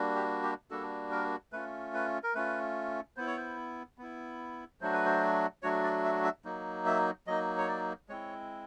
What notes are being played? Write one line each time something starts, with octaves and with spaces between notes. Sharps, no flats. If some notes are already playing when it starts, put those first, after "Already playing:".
Already playing: G3 A#3 D4 F#4
G4
G4
G3 A#3 D4 F#4 A4
A#4
A3 C#4 F4 B4
B4
A#4
A3 C#4 F4 B4
B3 E4 C5
C#5
C5
B3 E4
F#3 A3 D4 F#4 C5
B4
C5
F#3 A3 D4 F#4 C#5
D5
E5
E5
F#3 A#3 D#4
E5
F#3 A#3 D#4 D#5
C#5
D5
G#3 C4 E4 C#5